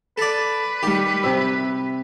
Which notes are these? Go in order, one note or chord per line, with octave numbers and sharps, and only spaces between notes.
A4 B4 D5
D#3 G3 G4
C3 E5